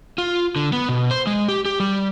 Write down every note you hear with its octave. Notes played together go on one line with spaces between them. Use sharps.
F4
D3
B3
B2
C5
G#3
G4
G4
G3